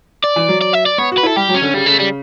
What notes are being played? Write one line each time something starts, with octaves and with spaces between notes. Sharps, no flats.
D5
E3
F#3
D5
E5
D5
B3 C#5
F#4
B4
E4 A4
G3 G4
F#3
C#4
D3
C#3 G3
C#3 A3
C#3 G3